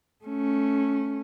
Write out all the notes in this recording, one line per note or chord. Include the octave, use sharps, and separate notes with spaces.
A3 C#4